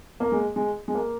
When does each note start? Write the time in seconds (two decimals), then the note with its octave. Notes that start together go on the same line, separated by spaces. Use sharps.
0.20 A#3
0.32 G#3
0.56 G#3
0.88 G#3
0.95 A#3